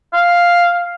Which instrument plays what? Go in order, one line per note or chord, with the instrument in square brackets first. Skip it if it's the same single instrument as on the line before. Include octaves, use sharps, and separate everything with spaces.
[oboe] F5